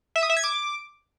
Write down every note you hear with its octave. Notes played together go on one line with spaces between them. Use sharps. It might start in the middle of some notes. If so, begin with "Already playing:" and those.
E5
D#6
E5
G#6
D6